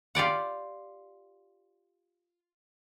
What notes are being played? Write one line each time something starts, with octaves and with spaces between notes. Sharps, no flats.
F4 G4 D5 F#5